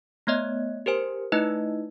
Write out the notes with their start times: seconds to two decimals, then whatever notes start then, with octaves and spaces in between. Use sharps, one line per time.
0.27 A3 B3 C#5 D#5
0.86 G4 A#4 C5 G#5
1.32 A3 D#4 E4 B4 D#5